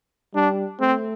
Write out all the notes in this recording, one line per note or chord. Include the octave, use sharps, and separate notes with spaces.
G3 D4
A3 C4